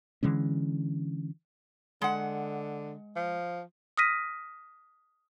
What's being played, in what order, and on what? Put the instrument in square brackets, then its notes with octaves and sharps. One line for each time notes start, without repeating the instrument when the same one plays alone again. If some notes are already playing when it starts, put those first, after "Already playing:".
[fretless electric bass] D3 E3 G#3 C#4
[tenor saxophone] D3 [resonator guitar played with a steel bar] G#3 F#5
[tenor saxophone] F3
[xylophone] D#6 F6 A#6 B6 D#7